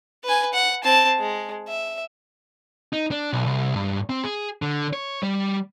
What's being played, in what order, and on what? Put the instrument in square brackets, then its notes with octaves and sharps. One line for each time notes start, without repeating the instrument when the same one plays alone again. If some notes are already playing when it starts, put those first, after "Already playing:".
[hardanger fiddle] B4 G#5
F#5
C4 A5
G#3
E5
[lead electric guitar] D#4
D4
B1
C2
G2
C4
G#4
D3
C#5
G3